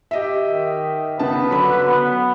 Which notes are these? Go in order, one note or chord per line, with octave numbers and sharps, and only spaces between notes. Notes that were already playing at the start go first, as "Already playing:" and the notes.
G4 D#5 E5
D#3
C#3 B3 B4 A5
D3 F#3 B5
B3